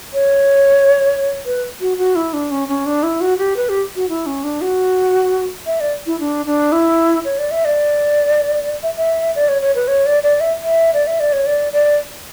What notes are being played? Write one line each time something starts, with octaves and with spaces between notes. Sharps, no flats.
C#5
B4
F#4
F#4
E4
D4
C#4
C#4
D4
E4
F#4
G4
B4
G4
F#4
E4
C#4
D4
F#4
E5
D5
E4
D4
D4
E4
C#5
D5
E5
D5
E5
E5
D5
C#5
C#5
B4
C#5
D5
D5
E5
E5
D5
E5
D5
C#5
D5
D5